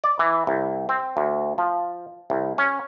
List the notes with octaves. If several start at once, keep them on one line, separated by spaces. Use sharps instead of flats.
D5
E3
C2
C4
D2
F3
C2
C#4